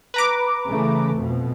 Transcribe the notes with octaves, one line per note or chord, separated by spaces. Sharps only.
B4 A#5 D6
C#3 E3 A3
F2 B2